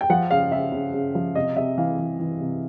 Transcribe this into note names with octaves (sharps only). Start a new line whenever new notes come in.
G5
F3 F#5
C#3 F5
C#3 E5
C#3
C#3
F3
C3 D#5
C3 E5
E3 F5
E3
E3
C3